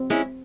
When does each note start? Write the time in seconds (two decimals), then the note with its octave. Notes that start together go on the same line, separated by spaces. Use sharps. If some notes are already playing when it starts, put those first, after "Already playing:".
Already playing: C4
0.10 G#3 C#4 E4